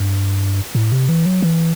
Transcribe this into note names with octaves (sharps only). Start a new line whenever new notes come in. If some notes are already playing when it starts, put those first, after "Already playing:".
Already playing: G2
A2
C3
E3
F#3
E3